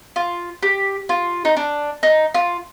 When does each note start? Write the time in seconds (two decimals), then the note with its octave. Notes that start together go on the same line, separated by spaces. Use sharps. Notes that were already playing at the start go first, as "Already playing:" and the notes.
0.16 F4
0.63 G4
1.09 F4
1.45 D#4
1.57 D4
2.03 D#4
2.34 F4